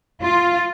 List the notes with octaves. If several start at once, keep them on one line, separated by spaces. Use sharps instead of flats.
F4